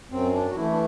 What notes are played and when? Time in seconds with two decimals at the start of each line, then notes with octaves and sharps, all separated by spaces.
0.10 F#2 C4
0.34 D4
0.50 F#4
0.56 E3 A3 E4
0.72 D4